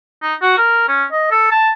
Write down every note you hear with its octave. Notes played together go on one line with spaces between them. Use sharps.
D#4
F#4
A#4
C#4
D#5
A4
A5